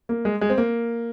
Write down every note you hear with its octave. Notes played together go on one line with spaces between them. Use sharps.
A#3
G#3
G#3
C4
A#3